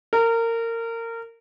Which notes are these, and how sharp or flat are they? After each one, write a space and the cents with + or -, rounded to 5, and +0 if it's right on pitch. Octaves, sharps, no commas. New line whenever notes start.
A#4 -25